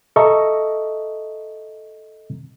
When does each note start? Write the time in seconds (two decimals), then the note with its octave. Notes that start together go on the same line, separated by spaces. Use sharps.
0.16 A4 D#5 E5 A#5 C#6